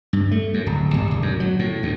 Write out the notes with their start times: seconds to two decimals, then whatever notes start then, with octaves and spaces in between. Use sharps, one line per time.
0.13 G2
0.31 A3
0.54 F#2
0.66 D1
0.94 G1
1.11 E1
1.23 F#2
1.40 F#3
1.59 A2
1.83 D2